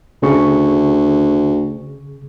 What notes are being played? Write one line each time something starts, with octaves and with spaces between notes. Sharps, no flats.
D2 C#3 G#4 C#6